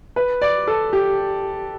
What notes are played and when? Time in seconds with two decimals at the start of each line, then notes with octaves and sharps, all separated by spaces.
0.16 B4
0.42 D5
0.67 A4
0.93 G4